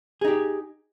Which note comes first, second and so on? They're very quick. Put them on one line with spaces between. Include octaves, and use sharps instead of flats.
G#4 D#4 G4